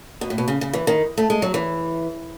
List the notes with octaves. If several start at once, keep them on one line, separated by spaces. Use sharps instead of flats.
B2
A2
B2
C#3
C#3
E3
D#3
A3
G#3
F#3
E3